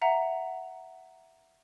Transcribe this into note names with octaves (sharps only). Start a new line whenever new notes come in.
E5 F#5 A#5